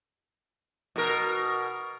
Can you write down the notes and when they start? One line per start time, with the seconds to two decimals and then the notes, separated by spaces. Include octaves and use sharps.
0.96 B2 A#4